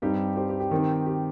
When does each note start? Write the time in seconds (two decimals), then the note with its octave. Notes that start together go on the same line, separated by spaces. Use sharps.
0.02 G2 G3 C4 D#4 G4
0.36 G4 C5
0.49 G4
0.60 G4
0.71 D#3 C4 D#4
1.06 G4